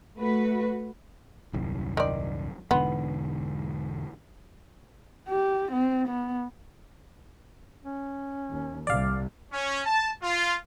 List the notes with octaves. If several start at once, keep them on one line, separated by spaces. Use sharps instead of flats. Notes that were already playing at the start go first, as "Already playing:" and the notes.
A3 F#4 B4
D#1 C2 F#2
D#3 D5
E1 G#2 D3 B3
G4
C4
B3
C#4
D#2
C2 C3 D5 F5
C#4
A5
F4